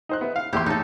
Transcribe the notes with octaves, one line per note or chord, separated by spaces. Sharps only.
D#4 C5 F#6
B3 E5
F5
A#1 E2 E4 G4 C6
E2 A2 D#4 A4